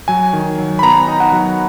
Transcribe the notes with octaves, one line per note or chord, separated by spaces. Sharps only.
F#3 G#5
D#3
F#3
B5
B3 A#5
D#4
F#5
F#3